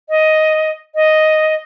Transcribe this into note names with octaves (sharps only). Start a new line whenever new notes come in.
D#5
D#5